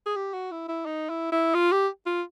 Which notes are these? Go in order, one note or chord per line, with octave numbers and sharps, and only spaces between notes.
G#4
G4
F#4
E4
E4
D#4
E4
E4
F4
G4
F4